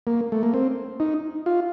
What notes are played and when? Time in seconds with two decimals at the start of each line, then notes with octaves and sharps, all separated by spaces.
0.07 A#3
0.32 A3
0.43 A#3
0.54 C4
1.00 D#4
1.46 F4